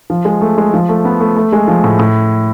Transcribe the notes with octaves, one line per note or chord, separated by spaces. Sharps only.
F3
G#3
A3
G#3
F3
A3
B3
A3
A3
G#3
F3
A2
A2